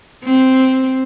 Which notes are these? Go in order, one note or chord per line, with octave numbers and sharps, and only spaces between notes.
C4